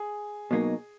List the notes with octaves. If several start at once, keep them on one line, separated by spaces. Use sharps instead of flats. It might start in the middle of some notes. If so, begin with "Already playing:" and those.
Already playing: G#4
B2 F#3 A#3 D#4